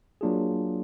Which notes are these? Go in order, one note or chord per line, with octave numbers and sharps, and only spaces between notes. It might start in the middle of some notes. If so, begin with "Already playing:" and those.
F#3 A#3 D4 F4 G#4